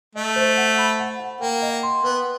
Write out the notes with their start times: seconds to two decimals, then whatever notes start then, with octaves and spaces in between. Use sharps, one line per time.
0.15 A3 D#5
0.36 C5
0.57 F#5
0.78 B5
1.00 F#5
1.20 F#5
1.41 A#3 G5
1.62 D#5
1.83 C6
2.04 B3 B4